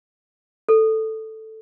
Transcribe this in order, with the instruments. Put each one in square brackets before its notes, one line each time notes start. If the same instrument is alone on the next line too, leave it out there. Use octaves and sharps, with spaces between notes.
[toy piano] A4